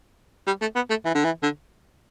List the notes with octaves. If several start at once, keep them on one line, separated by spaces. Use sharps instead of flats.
G3
A3
B3
A3
E3
D3
E3
D3